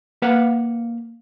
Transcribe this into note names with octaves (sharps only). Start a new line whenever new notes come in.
A#3 B4 F5 F#5